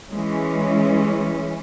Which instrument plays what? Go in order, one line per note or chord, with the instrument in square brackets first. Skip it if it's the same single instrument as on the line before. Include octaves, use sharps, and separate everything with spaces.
[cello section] E3 G#3 C#4